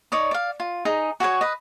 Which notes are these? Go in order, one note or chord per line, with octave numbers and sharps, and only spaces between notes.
D#4 C#5 D5 D#6
D5 F5
F4
D#4 G#4 A#5
F#4 G#4 B4 C#5
B4 D#5